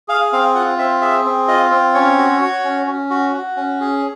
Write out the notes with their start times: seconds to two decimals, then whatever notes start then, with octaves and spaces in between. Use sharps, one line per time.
0.08 G#4 F5
0.33 C4 F5
0.55 F4 F#5
0.78 C4 E5
1.01 G#4 E5
1.25 C4
1.48 F4 D#5
1.71 C4
1.94 C#4 C#5
2.18 F#4
2.41 F#4
2.64 C#4
2.87 C#4
3.10 F#4
3.34 F#4
3.56 C#4
3.81 G#4